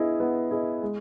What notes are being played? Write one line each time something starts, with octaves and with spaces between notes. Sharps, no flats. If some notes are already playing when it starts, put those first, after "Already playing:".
Already playing: B3 E4 G#4 D#5
B3
E4 G#4 D#5
G#3